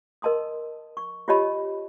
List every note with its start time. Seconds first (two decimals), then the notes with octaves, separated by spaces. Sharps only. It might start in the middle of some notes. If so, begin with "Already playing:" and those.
0.22 A#4 D#5 A5 C6 D#6
0.97 C#6
1.28 F4 G4 C#5 D#5 A5 B5